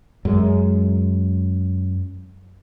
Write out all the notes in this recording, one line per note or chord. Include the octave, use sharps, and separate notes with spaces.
F#2 G#3